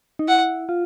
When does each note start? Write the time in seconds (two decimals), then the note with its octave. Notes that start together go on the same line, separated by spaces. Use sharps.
0.19 D#4
0.28 E4 F#5
0.69 F4